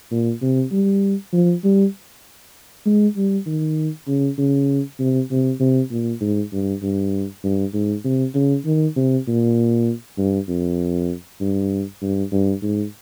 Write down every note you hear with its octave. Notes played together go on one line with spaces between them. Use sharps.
A#2
C3
G3
F3
G3
G#3
G3
D#3
C#3
C#3
C3
C3
C3
A#2
G#2
G2
G2
G2
G#2
C3
C#3
D#3
C3
A#2
G2
F2
G2
G2
G2
G#2